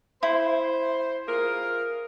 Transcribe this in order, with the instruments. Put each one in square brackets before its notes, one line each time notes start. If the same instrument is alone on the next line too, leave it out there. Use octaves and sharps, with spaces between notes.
[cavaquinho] E4 [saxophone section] C5
[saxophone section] F4 G#4 A#4